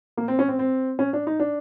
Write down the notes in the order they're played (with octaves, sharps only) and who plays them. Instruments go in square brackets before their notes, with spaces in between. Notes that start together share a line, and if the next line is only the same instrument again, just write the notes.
[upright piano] A#3
C4
C#4
C4
C4
C#4
D4
D#4
D4